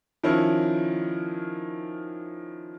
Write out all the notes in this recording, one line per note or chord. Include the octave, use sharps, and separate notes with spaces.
D#3 F3 C#4 E4